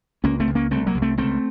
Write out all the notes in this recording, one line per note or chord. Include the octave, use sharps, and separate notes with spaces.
C#2 A#3 C#4
A3 C4
C#2
A#3 C#4
C2 A3 C4
F#3 A#3
C2
A3 C4
C#2 A3 C4